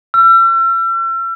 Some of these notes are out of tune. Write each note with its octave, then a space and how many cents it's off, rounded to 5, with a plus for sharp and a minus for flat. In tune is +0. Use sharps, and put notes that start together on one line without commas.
E6 +40